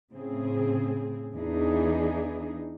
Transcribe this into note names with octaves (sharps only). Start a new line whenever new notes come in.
A2 C#3 C4 G#4
E2 E3 D4 D#4 G#4